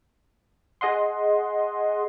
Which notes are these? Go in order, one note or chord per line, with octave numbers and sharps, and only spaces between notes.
G#4 D#5 F#5 C6